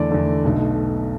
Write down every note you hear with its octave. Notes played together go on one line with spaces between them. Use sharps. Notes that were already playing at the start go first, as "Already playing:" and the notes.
Already playing: E2 D3 A3 D5
E2 D3 A3
B1 B2 A3